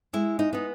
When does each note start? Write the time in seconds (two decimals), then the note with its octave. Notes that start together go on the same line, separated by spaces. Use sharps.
0.13 G#3 E4
0.39 D#4
0.53 B3 D#4